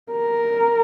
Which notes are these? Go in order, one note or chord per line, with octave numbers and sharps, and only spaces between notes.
A#4